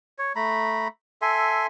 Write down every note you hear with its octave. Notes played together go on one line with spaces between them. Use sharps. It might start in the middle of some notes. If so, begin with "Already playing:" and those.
C#5
A3 A#5 B5
A4 E5 G#5 C6